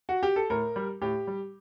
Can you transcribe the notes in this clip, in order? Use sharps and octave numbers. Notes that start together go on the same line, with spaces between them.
F#4
G4
A4
A2 A#4
G3
A2 G4
G3